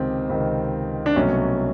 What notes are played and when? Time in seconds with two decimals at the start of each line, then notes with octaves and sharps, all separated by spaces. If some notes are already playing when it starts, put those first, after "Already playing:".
Already playing: C#2 C3 D#3 C4
0.29 C#2 C3 D#3
1.06 D4
1.16 C2 B2 F#3 A3 C#4